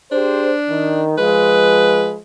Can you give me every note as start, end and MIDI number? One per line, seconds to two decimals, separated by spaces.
0.12 1.04 62
0.12 0.52 67
0.12 0.52 68
0.12 0.52 72
0.69 1.17 51
1.18 2.18 53
1.18 2.18 56
1.18 2.12 71